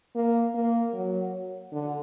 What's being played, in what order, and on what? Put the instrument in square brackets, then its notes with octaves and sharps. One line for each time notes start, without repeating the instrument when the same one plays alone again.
[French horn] A#3
A#3
F#3
D3